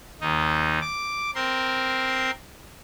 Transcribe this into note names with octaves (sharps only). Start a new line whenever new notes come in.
D#2 D#4
D6
C4 A#4 C6